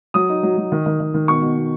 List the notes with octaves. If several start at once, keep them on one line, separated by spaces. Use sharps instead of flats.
F#3 D#6
D#4
F#3
F#3
D#3
D#3
D#3
D#3
B2 C#6
B2
B2